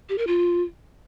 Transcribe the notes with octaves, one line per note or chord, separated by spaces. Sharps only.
G4
A#4
F4